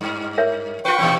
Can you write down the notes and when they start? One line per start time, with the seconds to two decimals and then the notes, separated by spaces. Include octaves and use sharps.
0.01 G2
0.38 A#4 C#5 E5
0.85 F4 B4 G5 C#6
0.99 A#2 E3 C4